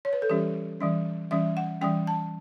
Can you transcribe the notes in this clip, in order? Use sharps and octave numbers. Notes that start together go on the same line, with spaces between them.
C#5
B4
A4
E3 G3 C#4 G4
E3 G3 C#4
E3 G3 C#4 E5
F#5
E3 G3 C#4 G5
A5